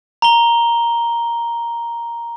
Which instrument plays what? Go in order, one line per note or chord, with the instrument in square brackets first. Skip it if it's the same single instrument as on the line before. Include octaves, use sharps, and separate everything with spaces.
[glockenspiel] A#5 G7